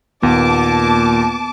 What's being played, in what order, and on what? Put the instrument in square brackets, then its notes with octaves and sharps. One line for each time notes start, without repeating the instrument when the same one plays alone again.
[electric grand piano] D#2 [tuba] A#2 [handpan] B3 [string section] A5 D6